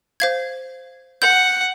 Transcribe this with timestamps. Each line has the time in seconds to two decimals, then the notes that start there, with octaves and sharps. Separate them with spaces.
0.20 C5 F5 G#6
1.22 F#5 G6